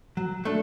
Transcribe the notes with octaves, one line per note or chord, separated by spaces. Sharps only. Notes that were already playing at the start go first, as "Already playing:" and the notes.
F#3
A3 D4